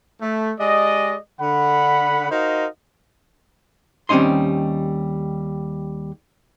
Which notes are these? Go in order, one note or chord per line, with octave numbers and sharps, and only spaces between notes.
A3
G#3 G4 D5 D#5
D3 F#5 B5
D#4 F#4 A#4 C5 D#5 F5
D#2 G3 C4 C#4 D#4 C6